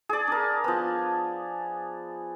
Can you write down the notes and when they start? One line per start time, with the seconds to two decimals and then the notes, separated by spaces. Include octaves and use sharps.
0.09 G#4 D5
0.27 D4 A#4
0.64 F3 B3